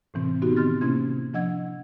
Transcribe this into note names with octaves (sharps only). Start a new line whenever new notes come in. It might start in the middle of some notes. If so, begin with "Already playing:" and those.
A2 C3 E3 C4
B3 C4 D#4 F#4 G4
D#3 C6 F6 A6
C3 A#3 C#4 E4 C6 G#6
F3 D4 D#5 F#5 E6 G#6